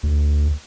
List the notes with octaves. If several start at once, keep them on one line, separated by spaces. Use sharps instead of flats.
D2